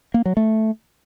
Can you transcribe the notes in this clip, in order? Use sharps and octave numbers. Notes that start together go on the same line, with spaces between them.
A#3
F#3
A3